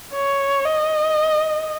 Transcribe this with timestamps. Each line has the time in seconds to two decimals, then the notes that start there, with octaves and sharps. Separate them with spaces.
0.14 C#5
0.65 D#5